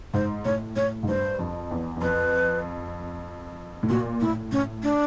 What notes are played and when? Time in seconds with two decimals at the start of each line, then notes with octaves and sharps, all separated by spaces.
0.13 G#2 C5
0.45 A2 C#5
0.76 A2 C#5
1.03 G#2
1.08 G2 C5
1.39 F2
1.71 E2
1.96 E2
2.01 F2 B4
3.83 A2
3.89 A#2 F#4
4.21 A2 E4
4.52 A2 C#4
4.83 D4